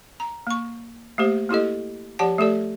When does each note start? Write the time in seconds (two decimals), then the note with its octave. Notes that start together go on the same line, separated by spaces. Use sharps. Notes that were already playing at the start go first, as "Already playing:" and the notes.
0.20 A#5
0.47 A#3 C#6
1.18 A3 A#3 G4 C5
1.49 A#3 E4 G4 A4 D#5
2.19 F3 G4 D5 F#5 A5
2.38 A3 G4 A4 D5